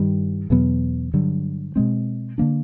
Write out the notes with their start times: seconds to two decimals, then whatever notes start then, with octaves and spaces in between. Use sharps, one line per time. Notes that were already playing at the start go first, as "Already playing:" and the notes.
Already playing: G2 D#3 G3
0.50 E2 B2 F#3 B3
1.14 G2 D3 F#3
1.76 B2 G#3 C4
2.38 D3 F#3 A#3 D4